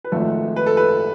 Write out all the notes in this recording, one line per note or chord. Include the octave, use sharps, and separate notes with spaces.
B4
G#1 G#2 F3 A3 A4
B4
A4
B4